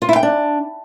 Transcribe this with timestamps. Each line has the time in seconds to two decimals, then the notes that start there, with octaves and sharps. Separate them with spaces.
0.02 F4
0.09 E4
0.16 G5
0.23 D4